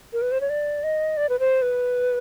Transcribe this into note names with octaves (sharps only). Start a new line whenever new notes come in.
A#4
B4
C5
C#5
D5
D#5
D5
B4
C5
B4